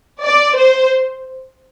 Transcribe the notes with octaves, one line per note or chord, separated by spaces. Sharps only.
D5
C5